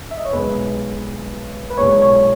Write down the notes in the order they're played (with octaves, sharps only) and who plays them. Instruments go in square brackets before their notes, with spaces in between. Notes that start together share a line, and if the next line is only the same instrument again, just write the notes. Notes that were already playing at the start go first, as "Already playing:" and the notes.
[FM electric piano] E5
D#5
C#5
[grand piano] B1 B2 G#3 [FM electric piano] B4
[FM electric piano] B4
[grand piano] B1 A#2 G#3 [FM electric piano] C#5
[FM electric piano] C#5